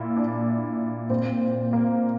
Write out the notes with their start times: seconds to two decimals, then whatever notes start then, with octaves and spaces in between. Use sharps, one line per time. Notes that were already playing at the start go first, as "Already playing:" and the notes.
Already playing: A#2 E4
0.17 D4
1.10 A#2 C4
1.73 A#3